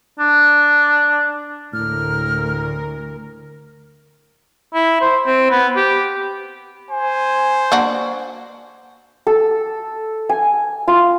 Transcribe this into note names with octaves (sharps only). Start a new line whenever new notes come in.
D4
D2 A2 A#4 F6
E4
C5
C4
B3
G4
C5 G#5
A#3 D4 F#4
A4
G#5
F4